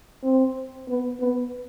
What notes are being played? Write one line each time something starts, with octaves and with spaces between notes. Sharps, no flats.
C4
B3
B3